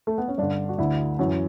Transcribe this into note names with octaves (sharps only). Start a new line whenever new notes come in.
A3
B3
C#4
G2 D3 D4
F#4
D2 D3 E4
F#2 E3 F#4